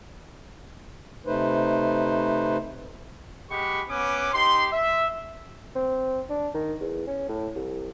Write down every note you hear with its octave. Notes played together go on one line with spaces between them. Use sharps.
C3 A3 D#4 B4 C5
G#3 G4 F#5 B5 C#6
B3 C#4 B4 D6
D#4 G4 C6
E5
C4
D4
D#3
E2
C#4
A2
C2